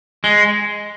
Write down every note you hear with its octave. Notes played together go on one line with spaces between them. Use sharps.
G#3